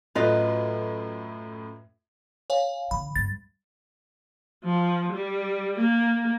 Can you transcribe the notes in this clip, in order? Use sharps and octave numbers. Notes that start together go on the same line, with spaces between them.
F#2 A2 F4 B4 D#5
C#5 F5 G#5
D3 B5
G2 A6
F3
G3
A#3